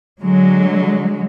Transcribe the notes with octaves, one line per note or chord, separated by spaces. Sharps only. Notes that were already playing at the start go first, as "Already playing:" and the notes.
D3 F#3 G#3